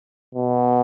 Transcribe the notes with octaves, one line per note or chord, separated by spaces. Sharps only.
B2